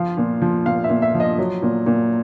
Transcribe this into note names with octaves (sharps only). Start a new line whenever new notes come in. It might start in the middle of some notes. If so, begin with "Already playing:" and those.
Already playing: F3 F5
A#2
F3
A#2 F5
E5
A#2
E5
F3
D#5
F#3
A#2
A#2